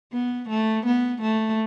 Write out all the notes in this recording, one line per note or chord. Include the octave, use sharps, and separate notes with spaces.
B3
A3
B3
A3